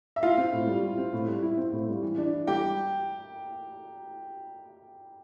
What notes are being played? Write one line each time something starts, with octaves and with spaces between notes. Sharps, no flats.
E5
E4 F4 F5
C4
A2
G3
E4
C4
A2
G3
E4
C4
A2
G3
E3
D4
E3
G3 G4 G5